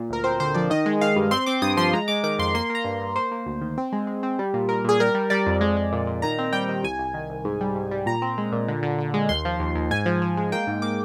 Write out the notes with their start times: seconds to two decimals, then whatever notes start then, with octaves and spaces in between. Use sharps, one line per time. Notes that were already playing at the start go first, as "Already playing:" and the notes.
Already playing: A#2
0.10 D2 A#4
0.24 C4 C5
0.40 D3 C5
0.54 F3 D5
0.70 D#3 D#5
0.86 G#3
1.01 D#3 F5
1.16 G2
1.31 C4 C6
1.46 C4 D6
1.62 G2 D#6
1.77 F3 C6
1.93 G#3 A#5
2.08 G#3 D6
2.23 D#3 D6
2.39 F2 C6
2.54 A#3 C6
2.70 A#3 A#5
2.84 G2
3.01 G2
3.16 A#3 C5
3.31 A#3
3.46 D2
3.61 D#3
3.78 C4
3.92 G#3
4.07 G#3
4.23 C4
4.39 G3
4.54 A#2
4.69 A#2 A#4
4.84 A#2 G#4
5.00 G3 A#4
5.15 G3
5.30 G3 D5
5.46 F2
5.61 G#3
5.77 G#3
5.92 A#2
6.07 A#2
6.22 D#3 A#5
6.38 C4
6.53 G3 G5
6.69 D#3
6.83 C2 G#5
6.99 C2
7.14 D#3
7.29 C2
7.45 G#2
7.61 G3
7.75 G#2
7.91 G3
8.06 A#2 A#5
8.22 C4
8.38 G#3
8.52 A#2
8.68 D3
8.83 D3
8.98 D3
9.14 G#3
9.29 D#2 C6
9.45 F3
9.59 D#2
9.75 D#2
9.91 G#2 G#5
10.06 F3
10.22 F3
10.37 G#3
10.52 A#3 G5
10.67 G#2
10.82 A#3 D6